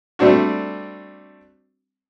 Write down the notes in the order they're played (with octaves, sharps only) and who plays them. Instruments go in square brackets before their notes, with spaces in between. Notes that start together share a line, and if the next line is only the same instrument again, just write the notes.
[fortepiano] G3 A3 C4 D4 F#4